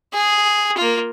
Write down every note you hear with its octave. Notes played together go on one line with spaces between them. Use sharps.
G#4
A#3 F4